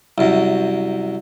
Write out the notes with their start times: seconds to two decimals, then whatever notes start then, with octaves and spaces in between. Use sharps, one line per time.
0.18 C2 F#2